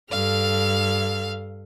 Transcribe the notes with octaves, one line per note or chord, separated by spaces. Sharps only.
G2 A4 F5 F6